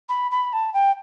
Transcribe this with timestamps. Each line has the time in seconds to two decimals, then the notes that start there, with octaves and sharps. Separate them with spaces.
0.09 B5
0.31 B5
0.53 A5
0.73 G5